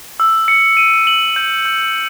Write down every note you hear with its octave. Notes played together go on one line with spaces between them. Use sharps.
E6
C#7
D#7
F#7
G6
G6